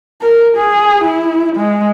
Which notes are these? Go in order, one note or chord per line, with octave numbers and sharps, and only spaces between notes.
A#4
G#4
E4
G#3